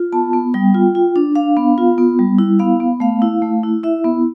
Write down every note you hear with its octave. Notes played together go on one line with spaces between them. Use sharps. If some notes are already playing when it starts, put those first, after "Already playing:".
Already playing: F4
B3 A5
B3
G3 G5
F4
F4
D4
D4 F5
B3
F4
B3
G3
E4
B3 F5
B3
A3 F5
E4
A3
E4
E4 E5
B3